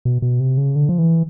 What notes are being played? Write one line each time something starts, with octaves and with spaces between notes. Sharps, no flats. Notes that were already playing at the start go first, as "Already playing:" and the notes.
B2
B2
C3
C#3
D3
F3
E3